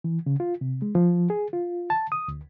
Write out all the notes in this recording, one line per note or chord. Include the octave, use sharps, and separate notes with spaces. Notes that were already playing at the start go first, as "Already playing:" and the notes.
E3
C#3
F4
C3
G#3
F3
G#4
F4
A5
D#6
D2